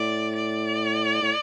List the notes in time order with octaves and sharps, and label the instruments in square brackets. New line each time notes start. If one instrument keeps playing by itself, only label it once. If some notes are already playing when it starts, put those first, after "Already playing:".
Already playing: [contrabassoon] A2 [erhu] D5
[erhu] D5
[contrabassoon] A2